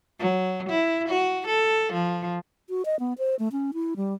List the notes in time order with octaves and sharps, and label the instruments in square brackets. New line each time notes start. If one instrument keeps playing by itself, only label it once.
[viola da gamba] F#3
E4
F#4
A4
F3
[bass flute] F#4
D#5
B3
C5
A3
C#4
E4
G3